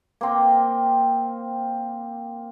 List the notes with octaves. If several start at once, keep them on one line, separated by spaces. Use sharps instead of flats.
A#3 C4 G5